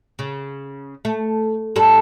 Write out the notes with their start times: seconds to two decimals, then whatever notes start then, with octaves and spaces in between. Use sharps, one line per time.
0.19 C#3
1.05 A3
1.76 G2 G3 A4